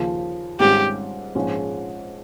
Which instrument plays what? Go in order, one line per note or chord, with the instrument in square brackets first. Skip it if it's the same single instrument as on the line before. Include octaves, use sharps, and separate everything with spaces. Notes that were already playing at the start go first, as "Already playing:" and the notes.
Already playing: [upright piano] D#2 C#3 F3
[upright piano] G#1 G#2 G3 C#4 F4 [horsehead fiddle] G4
[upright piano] A#1 G#2 F3 G#3 C#4